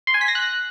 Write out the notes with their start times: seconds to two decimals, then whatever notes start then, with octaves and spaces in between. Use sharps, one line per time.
0.07 C6
0.14 G#5
0.21 B6
0.28 A#6
0.35 F#6